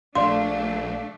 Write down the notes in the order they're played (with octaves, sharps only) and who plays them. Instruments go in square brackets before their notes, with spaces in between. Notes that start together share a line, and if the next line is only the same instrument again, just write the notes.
[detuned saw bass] A#1 [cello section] A3 D4 [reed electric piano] D5 F5 [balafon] C6